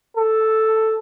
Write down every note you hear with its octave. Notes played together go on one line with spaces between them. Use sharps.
A4